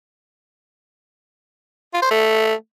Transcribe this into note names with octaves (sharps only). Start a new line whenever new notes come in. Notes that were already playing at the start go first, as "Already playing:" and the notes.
F4
C5
A3